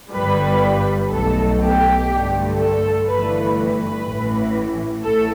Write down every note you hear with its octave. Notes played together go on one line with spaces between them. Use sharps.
G1 G2 G3 B4
B1 B2 A3 A4
G4
G2 D3 A3
A4
G1 G2 E3 A3 B4
B4
A1 A2 E3
A1 A2 A3 A4